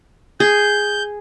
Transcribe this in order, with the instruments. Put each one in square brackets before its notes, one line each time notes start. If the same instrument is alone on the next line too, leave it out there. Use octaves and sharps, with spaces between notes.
[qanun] G#4 [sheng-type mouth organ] G6